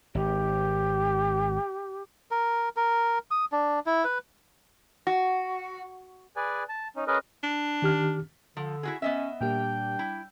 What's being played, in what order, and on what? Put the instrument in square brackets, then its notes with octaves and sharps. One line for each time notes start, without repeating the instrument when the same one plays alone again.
[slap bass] G#1 [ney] G4
[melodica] A#4
A#4
D#6
D4
E4
B4
[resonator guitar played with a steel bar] F#4
[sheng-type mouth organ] G#4 B4 D5 G#5
A5
C#4 D#4
C#4 G#4 A#4 B4 D#5
[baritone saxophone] D4
[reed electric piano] D#3 G4 F6
[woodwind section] D3 [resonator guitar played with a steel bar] F3
[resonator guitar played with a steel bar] E4 F#4 G#4
[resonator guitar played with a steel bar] B3 D#5 E5 [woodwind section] C#4
[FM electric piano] A#2 A#3 G4 [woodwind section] G3 D4 G5
[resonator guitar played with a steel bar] E4